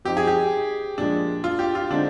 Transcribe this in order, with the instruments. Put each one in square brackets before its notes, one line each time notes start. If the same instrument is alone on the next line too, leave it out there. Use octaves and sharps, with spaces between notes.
[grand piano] F3 C4 D#4 [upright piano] G4
[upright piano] G#4
G4
[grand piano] A#2 F3 G#3 [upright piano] D4
[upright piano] F4
G4
F4
[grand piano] D3 G#3 C4 D#4 [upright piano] D4